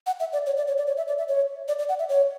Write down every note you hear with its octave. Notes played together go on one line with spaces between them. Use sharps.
F#5
E5
D5
C#5
D5
C#5
D5
C#5
E5
D5
E5
C#5
D5
D5
F#5
E5
C#5